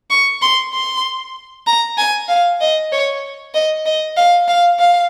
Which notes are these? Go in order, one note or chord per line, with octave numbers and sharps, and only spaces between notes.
C#6
C6
C6
A#5
G#5
F5
D#5
C#5
D#5
D#5
F5
F5
F5